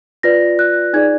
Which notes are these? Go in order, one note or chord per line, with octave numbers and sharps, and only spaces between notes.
F4 B4 D5 A#6
F#6
D#4 G#4 D5 G#6